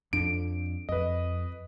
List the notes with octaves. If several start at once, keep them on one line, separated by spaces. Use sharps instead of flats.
F2 D4 D7
F2 B4 D#5